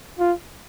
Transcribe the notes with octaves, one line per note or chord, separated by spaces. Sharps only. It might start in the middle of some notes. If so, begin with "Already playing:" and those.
F4